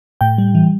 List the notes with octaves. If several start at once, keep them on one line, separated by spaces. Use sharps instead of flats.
A2 G5
G3
E3